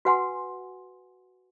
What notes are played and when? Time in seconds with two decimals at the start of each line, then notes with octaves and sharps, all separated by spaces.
0.05 F#4 B4 F#5 G#5 C6